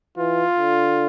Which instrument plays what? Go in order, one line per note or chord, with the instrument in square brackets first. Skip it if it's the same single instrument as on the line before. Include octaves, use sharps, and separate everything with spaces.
[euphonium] E3 [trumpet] F4
[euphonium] D3